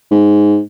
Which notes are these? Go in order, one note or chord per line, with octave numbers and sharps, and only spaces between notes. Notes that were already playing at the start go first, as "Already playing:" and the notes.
G#2